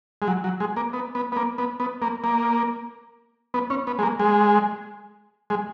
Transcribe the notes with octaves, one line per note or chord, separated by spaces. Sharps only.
G#3
F#3
F#3
G#3
A#3
B3
B3
B3
A#3
B3
B3
A#3
A#3
B3
C#4
B3
G#3
A#3
G#3
G#3